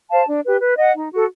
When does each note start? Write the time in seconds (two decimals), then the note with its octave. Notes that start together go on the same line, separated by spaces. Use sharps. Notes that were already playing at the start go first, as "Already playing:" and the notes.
0.10 C5 F5 A5
0.26 D4
0.44 G4 B4
0.61 B4
0.77 D#5 F#5
0.94 D#4
1.11 F#4 A4